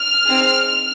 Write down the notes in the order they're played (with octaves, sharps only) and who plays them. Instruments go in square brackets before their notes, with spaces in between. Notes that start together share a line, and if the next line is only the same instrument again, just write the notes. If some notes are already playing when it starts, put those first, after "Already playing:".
Already playing: [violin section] F6
C4 D#4 G#4